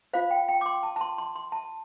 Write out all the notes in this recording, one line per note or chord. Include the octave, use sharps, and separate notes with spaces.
F4 C5 F5
G5
G5
D6
C6
A5
A5
C6
C6
C6
A5